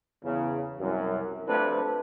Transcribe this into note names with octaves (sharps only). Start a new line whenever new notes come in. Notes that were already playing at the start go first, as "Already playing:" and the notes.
E2 C#3
C2 F#2
C3 F3 A3 D4 A4 B4